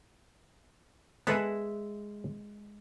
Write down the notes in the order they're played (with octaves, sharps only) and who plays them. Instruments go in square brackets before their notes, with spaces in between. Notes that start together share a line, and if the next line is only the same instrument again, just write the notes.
[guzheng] G#3 E5 F#5 [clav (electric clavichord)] B3 A4 B4